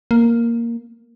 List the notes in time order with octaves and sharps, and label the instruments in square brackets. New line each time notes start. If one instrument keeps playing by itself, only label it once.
[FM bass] A#3